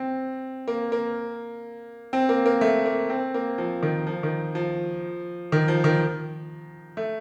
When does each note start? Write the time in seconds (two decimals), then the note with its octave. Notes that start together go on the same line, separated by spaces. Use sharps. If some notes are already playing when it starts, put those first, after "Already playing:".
Already playing: C4
0.68 A#3
0.92 A#3
2.13 C4
2.29 A#3
2.46 A#3
2.61 A3
2.86 A#3
3.10 C4
3.34 A#3
3.58 F3
3.83 D#3
4.07 F3
4.23 D#3
4.55 F3
5.52 D#3
5.68 F3
5.84 D#3
6.97 A3